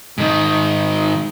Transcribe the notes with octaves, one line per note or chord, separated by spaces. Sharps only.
G#2 D#3